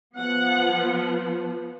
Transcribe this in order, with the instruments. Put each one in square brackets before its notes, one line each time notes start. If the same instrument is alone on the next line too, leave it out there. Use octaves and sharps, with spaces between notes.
[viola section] F3 B3 F#5